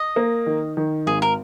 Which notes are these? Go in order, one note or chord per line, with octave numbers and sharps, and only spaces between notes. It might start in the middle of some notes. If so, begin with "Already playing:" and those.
Already playing: D#5
A#3
D#3
D#3
G#1 G#4
A#4